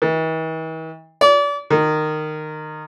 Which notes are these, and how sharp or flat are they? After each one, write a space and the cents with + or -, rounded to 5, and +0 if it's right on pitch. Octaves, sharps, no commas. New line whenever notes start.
E3 -45
D5 -35
D#3 -15